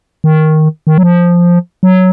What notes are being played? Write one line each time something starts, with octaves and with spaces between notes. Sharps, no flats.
D#3
D#3
F#3
F3
F#3